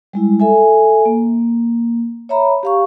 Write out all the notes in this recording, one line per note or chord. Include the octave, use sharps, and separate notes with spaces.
G3 G#3 E4
A4 E5 G#5
A#3
C#5 E5 A#5 B5
G4 F5 C#6